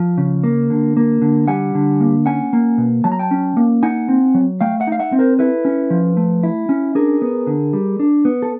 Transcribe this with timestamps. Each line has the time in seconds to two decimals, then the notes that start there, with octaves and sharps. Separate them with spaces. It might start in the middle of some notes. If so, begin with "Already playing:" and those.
Already playing: F3
0.18 C#3
0.43 A#3
0.70 D3
0.97 A#3
1.22 D3
1.48 G3 F#5 G#5
1.75 D3
2.01 A#3
2.26 C#4 F#5 G#5
2.53 A#3
2.78 B2
3.04 F#3 A5
3.12 A#5
3.19 G5 A5
3.31 C#4
3.57 A#3
3.83 D#4 F#5 G#5
4.08 C4
4.34 F#3
4.61 A3 F5 G5
4.80 E5 F#5
4.87 D#4 F5
4.99 E5 F#5
5.12 C4
5.19 A#4 C5
5.39 E4 A4 B4
5.65 C#4
5.90 F3
6.17 A3
6.43 E4
6.69 C#4
6.95 D4 G#4 A#4
7.22 B3
7.47 D3
7.73 G3
8.00 D4
8.25 B3
8.42 A4